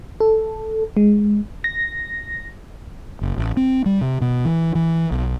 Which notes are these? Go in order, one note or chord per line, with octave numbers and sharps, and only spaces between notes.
A4
G#3
A#6
F#1
A1
C4
G3
C3
B2
E3
E3
B1